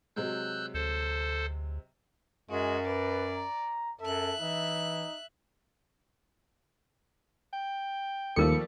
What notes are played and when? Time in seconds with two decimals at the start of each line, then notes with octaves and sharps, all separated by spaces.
0.16 C3 F#3 G#3 E6 F#6 G6
0.74 D2 A4 C5
2.50 F#2 G#3 F#4
2.87 B4 D5
3.34 A#5
4.01 F#2 A4 E5 F#6
4.40 E3 D#4
7.53 G5
8.36 D#2 F3 G3 A3 A4 A#4 C#7